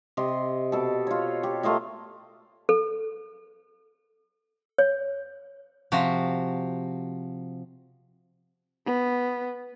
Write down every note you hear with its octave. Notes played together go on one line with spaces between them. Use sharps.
C3 D#5 C6
B2 A4
F4 C#5
G4
A3 F4 A#4 D#5
A4
C#5
C3 F3 F#4
B3